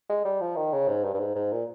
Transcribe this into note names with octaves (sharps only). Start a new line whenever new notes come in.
G#3
G3
F3
D#3
C#3
G#2
G2
G2
G#2
G#2
A#2